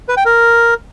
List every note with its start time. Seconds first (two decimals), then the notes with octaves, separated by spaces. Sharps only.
0.09 B4
0.17 G5
0.25 A#4